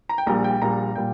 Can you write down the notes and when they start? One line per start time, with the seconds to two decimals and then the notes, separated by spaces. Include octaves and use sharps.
0.09 A#5
0.18 G5
0.26 A#1 A#2 G3 A#5
0.44 G5
0.62 A#1 A#2 G3 A#5
0.96 A#2 G3 G5